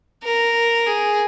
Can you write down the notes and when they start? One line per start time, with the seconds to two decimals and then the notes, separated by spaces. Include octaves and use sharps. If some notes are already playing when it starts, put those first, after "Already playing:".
0.23 A#4
0.87 G#4